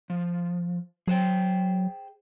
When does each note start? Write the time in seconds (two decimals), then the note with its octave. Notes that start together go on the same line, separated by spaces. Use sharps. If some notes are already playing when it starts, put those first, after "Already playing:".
0.10 F3
1.07 F#3 G#4 C5 G5